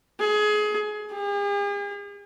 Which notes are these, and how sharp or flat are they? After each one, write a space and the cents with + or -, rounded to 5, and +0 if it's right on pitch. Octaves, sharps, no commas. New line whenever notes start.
G#4 +25
G#4 -45